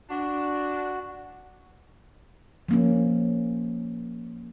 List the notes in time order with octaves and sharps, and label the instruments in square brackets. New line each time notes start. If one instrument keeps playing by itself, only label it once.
[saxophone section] D4 [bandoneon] F#4
[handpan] F3 A#3 C#4